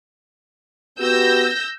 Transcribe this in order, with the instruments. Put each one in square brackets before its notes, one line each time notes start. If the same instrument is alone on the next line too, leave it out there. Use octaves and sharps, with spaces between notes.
[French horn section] B3 F#4 G4 [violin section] E6 G6 A#6